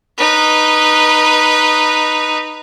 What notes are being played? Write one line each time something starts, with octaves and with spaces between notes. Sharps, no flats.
D#4 B4